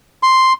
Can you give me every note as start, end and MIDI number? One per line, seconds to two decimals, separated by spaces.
0.23 0.53 84